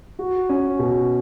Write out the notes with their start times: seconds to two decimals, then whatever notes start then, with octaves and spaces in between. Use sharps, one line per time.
0.19 F#4
0.49 C#4
0.79 B2